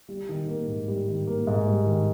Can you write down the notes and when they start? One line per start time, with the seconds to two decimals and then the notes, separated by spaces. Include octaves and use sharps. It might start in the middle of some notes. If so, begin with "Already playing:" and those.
0.09 G3
0.29 D#3
0.48 A#3
0.67 G#2
0.88 G3
1.07 D#3
1.27 A#3
1.47 G#2
1.67 G3
1.85 D#3